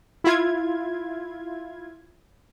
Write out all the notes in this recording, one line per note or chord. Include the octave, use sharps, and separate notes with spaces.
E4 F4 G#6